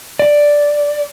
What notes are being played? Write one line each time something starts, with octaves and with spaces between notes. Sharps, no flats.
D5